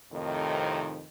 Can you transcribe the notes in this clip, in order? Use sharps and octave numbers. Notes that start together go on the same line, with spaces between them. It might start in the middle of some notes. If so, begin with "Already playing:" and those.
F2 A2 C3 D#3